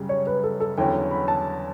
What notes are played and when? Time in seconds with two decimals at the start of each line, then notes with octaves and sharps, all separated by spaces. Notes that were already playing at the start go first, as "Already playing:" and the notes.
Already playing: F#2 C#3 G3
0.09 C#5
0.27 B4
0.44 A4
0.60 A4
0.78 E2 D3 F#3 C#4 E4 G5
1.11 B5
1.28 A5